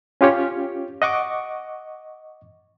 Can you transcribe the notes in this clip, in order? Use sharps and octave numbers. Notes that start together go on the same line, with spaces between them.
C#4 F4 G4 C#5
D#5 F#5 C#6 D6